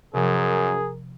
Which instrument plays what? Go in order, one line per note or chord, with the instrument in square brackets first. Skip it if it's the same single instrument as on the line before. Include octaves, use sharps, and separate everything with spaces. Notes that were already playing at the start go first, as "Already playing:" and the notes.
[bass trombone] F#2 [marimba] C3 F3 [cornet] G#4 [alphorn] A#4